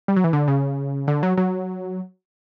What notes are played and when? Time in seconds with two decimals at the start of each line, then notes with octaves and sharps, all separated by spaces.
0.08 G3
0.16 F#3
0.24 E3
0.33 D3
0.48 C#3
1.08 D3
1.23 F#3
1.37 F#3